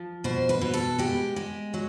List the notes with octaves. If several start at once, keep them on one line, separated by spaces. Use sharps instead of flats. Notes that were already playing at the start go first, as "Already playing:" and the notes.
Already playing: F3
B2 C5
B4
B2
A4
G#3 G4
G#3
F#3